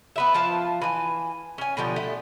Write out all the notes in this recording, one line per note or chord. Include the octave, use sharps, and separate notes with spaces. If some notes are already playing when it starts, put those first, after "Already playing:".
B3 B4 E5
F3 F4 A5
E3 G#5
C#4 G#5
B2 D3 F3 G4
A3